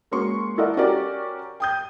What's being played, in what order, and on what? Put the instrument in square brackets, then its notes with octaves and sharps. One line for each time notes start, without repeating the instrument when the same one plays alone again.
[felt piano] G#3 A#3 C#4 F#4 C6 C#6
E4 A4 A#4 D5 D#5 F#5
C#4 F#4 G4 A#4 D5
G5 D#6 G6